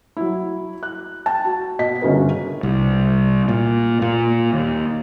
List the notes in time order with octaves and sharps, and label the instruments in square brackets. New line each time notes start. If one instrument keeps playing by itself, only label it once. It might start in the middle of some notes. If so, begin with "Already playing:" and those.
[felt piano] F#3 E4
F#6
G5 A5
F#4
B2 D#5 B6
G1 C#3 F#4 A#4 B4
[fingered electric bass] C2
A#2
A#2
D#2